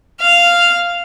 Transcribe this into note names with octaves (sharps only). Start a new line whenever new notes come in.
F5